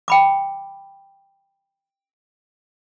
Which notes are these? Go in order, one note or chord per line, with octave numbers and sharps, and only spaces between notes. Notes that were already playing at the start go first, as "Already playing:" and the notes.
G5 B5 D6